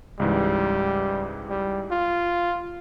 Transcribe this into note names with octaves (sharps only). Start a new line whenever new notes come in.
C#2 G#2 E3 G3
G3
F4